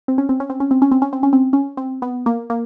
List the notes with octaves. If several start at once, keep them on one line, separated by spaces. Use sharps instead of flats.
C4
C#4
C4
C#4
C4
C#4
C4
C#4
C4
C#4
C4
C#4
C4
C#4
C4
B3
A#3
A#3